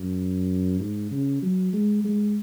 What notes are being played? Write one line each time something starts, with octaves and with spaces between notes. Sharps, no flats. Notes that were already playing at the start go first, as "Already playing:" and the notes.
Already playing: F#2
G#2
C#3
F#3
G#3
G#3